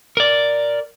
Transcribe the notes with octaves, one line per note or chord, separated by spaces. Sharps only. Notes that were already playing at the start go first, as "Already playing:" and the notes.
A#4 D5